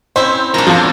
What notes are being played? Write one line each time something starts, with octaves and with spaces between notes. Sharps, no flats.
C4 C#4 E4 C5
F3 D4 F4 A#4
E2 F3 A5